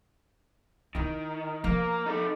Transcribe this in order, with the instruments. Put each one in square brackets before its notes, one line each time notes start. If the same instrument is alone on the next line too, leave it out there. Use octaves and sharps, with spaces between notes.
[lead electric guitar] D#3 [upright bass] D#4 E4
[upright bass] F3 [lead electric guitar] A#3
[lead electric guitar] D#4 A4